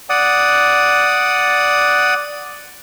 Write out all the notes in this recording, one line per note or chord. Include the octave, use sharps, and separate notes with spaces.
D5 F#5 D#6